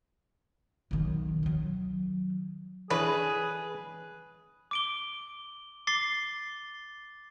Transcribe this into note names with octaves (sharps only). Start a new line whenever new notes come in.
B1 D#3
D#3 F#3
E3 D4 G#4 B4 C#5
D6 D7 G7
D6 A6 C7 G7